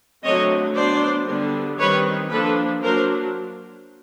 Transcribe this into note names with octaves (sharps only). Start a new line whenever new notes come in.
D3 F#3 A3 C4 C#5 D#5
F#3 B3 D4 C5 D5
D3 G3 B3 D4
D#3 G3 C4 B4 C#5
F3 A#3 D4 A4 B4
F#3 A#3 D4 A#4 C5